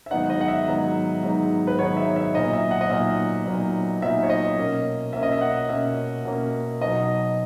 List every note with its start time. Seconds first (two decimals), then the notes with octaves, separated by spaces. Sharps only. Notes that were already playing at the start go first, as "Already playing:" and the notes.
0.06 E5
0.11 G#2 D#3 F#3 B3 D#4 F#5
0.30 D#5
0.41 F#5
0.48 E5
0.67 G#2 D#3 F#3 B3 D#4
1.23 G#2 D#3 F#3 B3 D#4
1.67 B4
1.79 G#2 D#3 F#3 B3 D#4 C#5
1.97 E5
2.16 E5
2.34 A#2 F#3 B3 D#4 D#5
2.53 E5
2.71 F#5
2.81 D#5
2.90 A#2 F#3 B3 D#4 E5
3.46 A#2 F#3 B3 D#4
4.02 A#2 F#3 B3 D#4 E5
4.23 C#5
4.30 D#5
4.57 B2 A#3 C#4
5.13 B2 A#3 C#4 E5
5.23 D#5
5.32 E5
5.41 F#5
5.69 B2 A#3 C#4 E5
6.25 B2 A#3 C#4
6.81 B2 F#3 B3 D#4 D#5